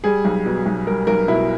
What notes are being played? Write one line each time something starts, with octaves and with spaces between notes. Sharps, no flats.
G3 G#4
B1
B2
B1
G3 A#4
B1 A#4
B2 E4